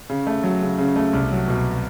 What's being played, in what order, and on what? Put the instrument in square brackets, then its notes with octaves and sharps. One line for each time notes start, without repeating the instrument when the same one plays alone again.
[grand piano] C#3
A3
F#3
C#3
C#3
A3
C2
F#3
B2